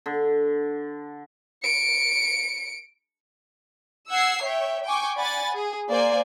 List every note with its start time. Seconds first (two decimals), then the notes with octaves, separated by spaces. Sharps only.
0.06 D3
1.63 C#7 D7
4.09 F#5 E6 G#6 C7
4.43 C#5 E5 G5
4.85 G5 G#5 C#6 D6
5.17 D5 F#5 G#5 B5 A6
5.54 G#4
5.89 A#3 C5 D5 G#5